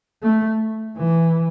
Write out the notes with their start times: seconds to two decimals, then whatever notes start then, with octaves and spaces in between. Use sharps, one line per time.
0.23 A3
0.98 E3